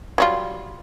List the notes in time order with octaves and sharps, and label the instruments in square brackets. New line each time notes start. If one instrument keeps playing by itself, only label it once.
[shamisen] F#3 G3 F4